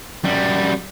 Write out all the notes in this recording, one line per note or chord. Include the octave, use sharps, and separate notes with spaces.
F#2 G3